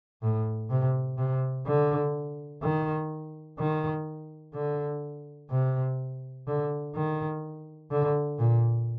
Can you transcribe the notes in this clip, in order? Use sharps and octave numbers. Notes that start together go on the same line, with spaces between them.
A2
C3
C3
D3
D#3
D#3
D3
C3
D3
D#3
D3
A#2